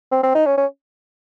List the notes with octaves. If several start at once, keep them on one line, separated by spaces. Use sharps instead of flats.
C4
C4
D#4
C#4
C#4